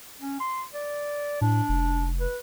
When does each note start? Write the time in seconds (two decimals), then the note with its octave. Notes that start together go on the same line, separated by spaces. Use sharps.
0.20 C#4
0.40 C6
0.74 D5
1.41 A2 D4
1.69 F1
2.20 B4